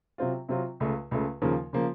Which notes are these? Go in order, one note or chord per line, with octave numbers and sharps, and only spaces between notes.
C3 F#3 C4 F4
C3 F#3 C4 F4
C#2 C#3 A3
C#2 C#3 A3
D#2 C#3 F3 A#3
C#3 F3 A#3